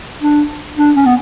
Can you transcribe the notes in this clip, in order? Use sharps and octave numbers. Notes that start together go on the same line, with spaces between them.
D4
D4
C#4
B3